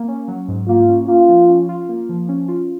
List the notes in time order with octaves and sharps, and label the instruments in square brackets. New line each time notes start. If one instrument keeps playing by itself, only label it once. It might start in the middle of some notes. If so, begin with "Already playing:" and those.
Already playing: [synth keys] A#3
C#4
F#3
G#2
[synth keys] A#3 [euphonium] F4
[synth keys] C#4
[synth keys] A#3 [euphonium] F4
[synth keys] F3
C#4
F4
A#3
F3
C#4
F4